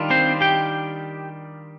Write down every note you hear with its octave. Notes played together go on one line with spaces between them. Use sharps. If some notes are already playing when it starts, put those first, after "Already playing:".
Already playing: D#3 G3 D4 F4
C4 C5
G4 G5